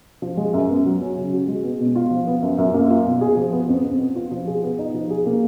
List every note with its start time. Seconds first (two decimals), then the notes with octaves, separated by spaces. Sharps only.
0.22 F3
0.37 G#3
0.53 F#2
0.70 B3
0.85 F#3
1.01 C#4
1.17 C#3
1.33 F#4
1.48 G#3
1.64 B3
1.80 B2
1.96 F4
2.11 F3
2.27 B3
2.42 F#2
2.58 F#2
2.74 A#3
2.90 F4
3.06 B2
3.21 G#4
3.37 F3
3.53 B3
3.69 F2
3.85 F2
3.99 B3
4.16 F4
4.31 F3
4.47 G#4
4.63 B3
4.79 D#4
4.94 F3
5.10 G#4
5.26 A#3